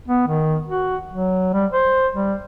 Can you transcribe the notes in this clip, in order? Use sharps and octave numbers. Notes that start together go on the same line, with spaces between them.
B3
D#3
F#4
F#3
G3
C5
G3